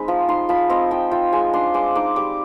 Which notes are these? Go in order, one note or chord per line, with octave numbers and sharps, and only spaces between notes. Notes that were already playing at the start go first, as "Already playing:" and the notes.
Already playing: G#3 C4 D#4 B5
F3
D#4 C6
F3 B5
C4 D#5
F3 G5
F4 G5
G#3 G#5
D4 C6
G#3 D6
D#4 D6
G3 D6